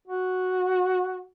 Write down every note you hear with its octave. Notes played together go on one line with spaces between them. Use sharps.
F#4